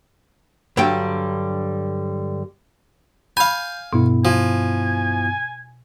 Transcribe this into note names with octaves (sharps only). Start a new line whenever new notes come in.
G2 D3 F#3 G3 G5
F5 G#5 B5 G6
G2 B2 B3 E4
F3 G#5